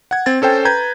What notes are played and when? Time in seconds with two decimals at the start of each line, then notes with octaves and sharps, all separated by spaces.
0.11 F#5 G#6
0.26 C4 G#6 A6
0.42 C#4 A4 C5 G5
0.65 B4 A#5 G6 G#6